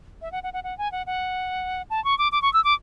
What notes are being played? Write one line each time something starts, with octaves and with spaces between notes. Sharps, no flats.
E5
F#5
F#5
F#5
F#5
G#5
F#5
F#5
A5
C#6
D6
D6
C#6
E6
D6